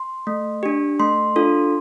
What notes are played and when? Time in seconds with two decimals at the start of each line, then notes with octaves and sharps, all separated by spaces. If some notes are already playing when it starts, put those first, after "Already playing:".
Already playing: C6
0.27 A3
0.63 D4 G4
1.00 A3 C6
1.36 D4 F4 A4